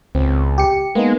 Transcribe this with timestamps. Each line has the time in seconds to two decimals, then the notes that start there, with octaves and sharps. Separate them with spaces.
0.15 C#2 C4
0.58 G4 C#7
0.95 G#3 A#3 B3 D#4